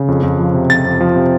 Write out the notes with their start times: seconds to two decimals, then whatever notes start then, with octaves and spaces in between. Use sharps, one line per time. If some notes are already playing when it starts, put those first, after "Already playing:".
Already playing: C#3
0.08 F2
0.23 F2
0.39 F3
0.54 C3
0.70 F2 A6
0.85 F2
1.00 F3
1.16 C3